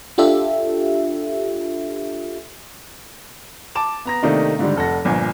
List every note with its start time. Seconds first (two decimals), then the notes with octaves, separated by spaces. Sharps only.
0.18 D4 F4 G4 A4 E5
3.75 A5 D6 E7
4.05 B3 A#5 A#6
4.22 C3 D#3 A3 A#3 D4 D#4
4.59 G#2 D3 D#3 G3
4.76 F1 A4 F#5 A#6
5.05 G1 A#2 F3 G#5